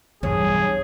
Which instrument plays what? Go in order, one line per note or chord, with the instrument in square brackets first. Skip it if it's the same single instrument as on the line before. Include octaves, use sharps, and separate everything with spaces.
[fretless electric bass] B1 E2 [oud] G2 [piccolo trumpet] G#4 [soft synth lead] C#5